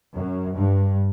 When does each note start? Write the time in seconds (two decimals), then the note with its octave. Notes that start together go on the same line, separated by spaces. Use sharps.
0.15 F#2
0.55 G2